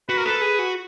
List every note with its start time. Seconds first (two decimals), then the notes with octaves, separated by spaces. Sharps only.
0.09 F#4 B4
0.17 A#4
0.25 A4 B4
0.41 G#4
0.59 F#4